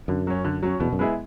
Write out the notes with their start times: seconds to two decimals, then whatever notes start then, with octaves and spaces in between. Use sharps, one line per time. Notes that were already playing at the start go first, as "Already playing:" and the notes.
0.08 F#2 D3
0.27 F#3 C#4
0.45 D3
0.63 F#3 C#4
0.80 E2 B2
0.93 F#2
0.99 G#3 B3 E4 G#4